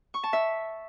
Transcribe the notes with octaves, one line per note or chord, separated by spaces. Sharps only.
C#6
A5
E5